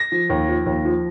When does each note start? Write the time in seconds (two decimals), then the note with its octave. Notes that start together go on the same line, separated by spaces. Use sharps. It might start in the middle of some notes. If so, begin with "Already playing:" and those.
Already playing: A#6
0.12 F3
0.30 D#2
0.48 F3
0.66 D#2
0.85 F3